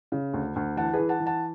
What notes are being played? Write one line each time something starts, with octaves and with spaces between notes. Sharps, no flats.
C#3
D2
D2
E3 F#5 A5
G#4 B4
E3
F#5 A5
E3
F#5 A5